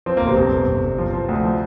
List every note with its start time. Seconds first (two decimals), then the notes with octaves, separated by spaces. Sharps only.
0.06 F3 C4
0.17 G1 A#3
0.27 C3 C4
0.37 G1
0.52 G1
0.67 G1
0.83 G1
0.98 F3
1.13 F3
1.29 D2
1.44 F3